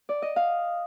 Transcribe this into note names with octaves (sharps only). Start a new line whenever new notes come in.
D5
D#5
F5